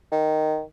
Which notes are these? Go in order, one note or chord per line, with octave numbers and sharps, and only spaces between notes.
D#3